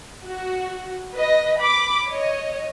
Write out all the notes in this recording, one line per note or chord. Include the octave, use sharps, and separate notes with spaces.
F#4
B4 D#5 A#6
B5 D6
C#5 D#5